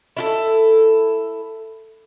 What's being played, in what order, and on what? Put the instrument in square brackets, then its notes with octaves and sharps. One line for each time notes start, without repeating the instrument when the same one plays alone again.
[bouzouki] E4 F4 A4